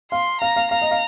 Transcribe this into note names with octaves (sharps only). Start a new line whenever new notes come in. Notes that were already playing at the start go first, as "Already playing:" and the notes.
F5 C6
F5 A#5
F5
F5 A#5
D#5
F5